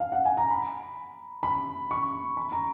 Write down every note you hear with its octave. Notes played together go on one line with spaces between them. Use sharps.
F5
F#5
G#5
A#5
B5
B5
C#6
B5
A#5